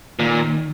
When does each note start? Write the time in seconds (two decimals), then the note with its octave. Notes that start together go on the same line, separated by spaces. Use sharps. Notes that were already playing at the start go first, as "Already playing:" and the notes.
0.19 A#2 D#3